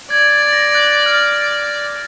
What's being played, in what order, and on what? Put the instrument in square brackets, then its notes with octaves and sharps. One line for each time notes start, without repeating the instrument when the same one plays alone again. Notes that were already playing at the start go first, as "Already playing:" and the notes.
[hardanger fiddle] D5 [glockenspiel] G#6
[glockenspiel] A6
A#6
A6
F#6
F6